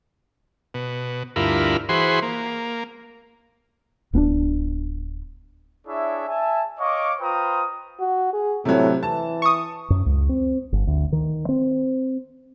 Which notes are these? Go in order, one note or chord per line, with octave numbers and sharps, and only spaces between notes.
B2
D2 G2 E4 F4 A#4 B5
E3 F#4 G#4 C5 B5 C6
A#3
D1 B3 C#4 D4
D4 E4 G#4 C#5 E5
E5 G#5 A5
C#5 D#5 F5 C#6 D6
F4 B4 C5 G5 A#5 D#6
F#4
G#4
A2 C3 F#3
E3 A5
C#6 D#6
F#2
C#2
C4
G1
D2
D#3
C4